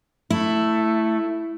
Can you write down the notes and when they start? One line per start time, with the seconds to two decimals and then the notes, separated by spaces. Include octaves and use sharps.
0.30 A3 E4